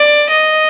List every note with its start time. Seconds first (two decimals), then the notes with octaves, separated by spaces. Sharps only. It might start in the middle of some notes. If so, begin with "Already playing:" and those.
Already playing: D5
0.29 D#5